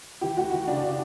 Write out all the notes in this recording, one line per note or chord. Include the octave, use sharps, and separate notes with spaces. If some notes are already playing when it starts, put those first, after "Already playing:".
E3 G4
D2 F#4
E3 F#4
C#3 D4
C#3